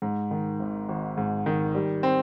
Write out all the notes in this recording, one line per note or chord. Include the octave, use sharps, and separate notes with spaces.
G#2
D#3
G#1
G#1
G#2
D#3
G3
C4